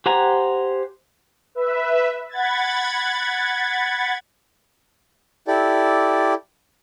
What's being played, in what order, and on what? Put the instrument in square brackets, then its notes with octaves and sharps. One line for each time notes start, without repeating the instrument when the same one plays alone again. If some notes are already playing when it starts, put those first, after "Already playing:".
[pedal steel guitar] G4 C5 F#5 G#5 A#5
[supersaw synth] B4 E5
F#5 B5 G#6 A6
[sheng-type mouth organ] E4 G4 A4 D5